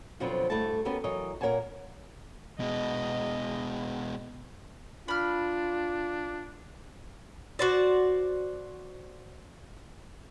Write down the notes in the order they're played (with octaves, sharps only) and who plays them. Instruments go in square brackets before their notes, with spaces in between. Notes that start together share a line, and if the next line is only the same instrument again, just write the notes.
[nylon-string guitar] F2 B2 D3 F3 F#3 C4
G2 A3 E4 F#4 A4 A5
B3 C#4 F#4 G4 A4 A#4
E3 F#3 A#4 C#5 D#5
A#2 A#4 C#5 F#5 G#5 A5
[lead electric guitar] B2 G#3 [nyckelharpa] D#5
[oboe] D4 [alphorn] F4 [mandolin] B5 F6
[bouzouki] F#4 C5 D5